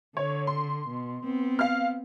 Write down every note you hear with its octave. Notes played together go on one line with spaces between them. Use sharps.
D3 C#5
C6
B2
B3 C4
F5 F6